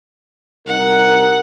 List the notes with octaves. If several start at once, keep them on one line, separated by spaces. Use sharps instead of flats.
C2 D#4 A#4 F#5